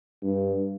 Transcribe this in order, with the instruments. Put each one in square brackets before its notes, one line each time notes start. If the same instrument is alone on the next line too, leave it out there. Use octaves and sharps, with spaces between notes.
[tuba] G2